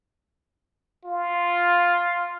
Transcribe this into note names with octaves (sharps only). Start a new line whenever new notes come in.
F4